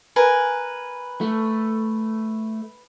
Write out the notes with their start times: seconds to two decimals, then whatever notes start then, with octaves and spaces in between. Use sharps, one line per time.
0.16 A#4 B4 G#5
1.21 A3